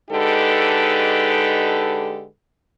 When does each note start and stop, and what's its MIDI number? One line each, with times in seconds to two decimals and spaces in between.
0.10 2.24 50
0.10 2.24 56
0.10 2.24 63
0.10 2.24 67
0.10 2.24 69
0.10 2.24 71